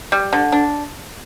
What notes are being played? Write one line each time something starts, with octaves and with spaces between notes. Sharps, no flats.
G3
D3
D4